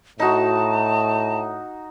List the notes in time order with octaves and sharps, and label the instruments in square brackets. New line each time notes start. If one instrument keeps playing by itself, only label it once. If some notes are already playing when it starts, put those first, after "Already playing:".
[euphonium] A2 [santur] D#4 F#4 [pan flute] A5